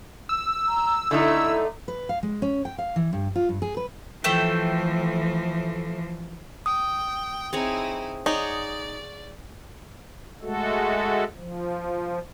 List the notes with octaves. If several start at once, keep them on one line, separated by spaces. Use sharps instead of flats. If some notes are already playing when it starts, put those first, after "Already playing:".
E6
A#5
D3 A3 D#4 E4
B4
F5
G#3
C#4
G5
F5
E3
G2
F4
G2
G#4
B4
E3 F3 A3 E5 G5
G5 D#6
C4 D#4 E4 G#4 C#5
D#4 G#4 C#5 D5 F#5
G#3 A3 F#4 A4
F3